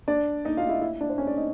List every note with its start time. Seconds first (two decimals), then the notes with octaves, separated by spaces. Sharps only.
0.08 D4 D5
0.45 D#4 D#5
0.57 F4 F5
0.69 E4 E5
0.81 E4 E5
1.01 D4 D5
1.09 C5
1.18 C#4 C#5
1.27 D4 D5
1.37 D#4 D#5